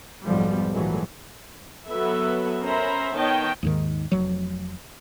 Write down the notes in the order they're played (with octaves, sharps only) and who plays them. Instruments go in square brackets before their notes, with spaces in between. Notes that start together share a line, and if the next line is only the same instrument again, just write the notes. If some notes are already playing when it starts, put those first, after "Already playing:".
[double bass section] B1 F2 G#2 B2 F3 G3
A#1 G#2 E3 F#3 G#3 A3
[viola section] F#3 B3 A4 B4 E5
C#4 A#4 C5 E5 A#5 B5
D#3 B3 C#5 D#5 G5 A5
[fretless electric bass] D#2 G#2 D#3
F1 F#3